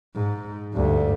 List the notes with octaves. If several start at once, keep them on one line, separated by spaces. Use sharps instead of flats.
G#2
D2 G2